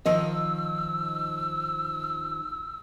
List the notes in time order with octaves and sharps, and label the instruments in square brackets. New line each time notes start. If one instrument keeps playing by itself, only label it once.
[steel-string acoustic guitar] D#3 F3 D#5 [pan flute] E6